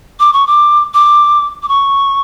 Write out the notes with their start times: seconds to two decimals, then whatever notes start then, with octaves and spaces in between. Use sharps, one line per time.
0.20 D6
0.33 C#6
0.47 D6
0.94 D6
1.63 D6
1.68 C#6